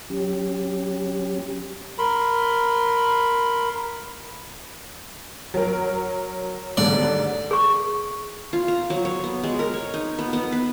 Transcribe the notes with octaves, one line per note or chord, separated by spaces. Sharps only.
F#3 C#4 G4
A#4 B5 C6
F#3 A#4
A1 G#2 D3 D5
G#4 C#6
F4
A#5
F#3
C#5
B3
G#3
A#4
C#5
D#4
B3
B3
B4